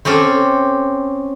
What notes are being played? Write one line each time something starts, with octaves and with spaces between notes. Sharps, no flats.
C4 C#4 G4 A4